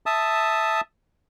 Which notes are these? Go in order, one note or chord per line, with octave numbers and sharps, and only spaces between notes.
E5 A5 D#6